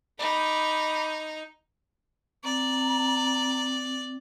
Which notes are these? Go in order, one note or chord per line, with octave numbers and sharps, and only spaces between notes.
D#4 B5 D6
C4 D5 A#5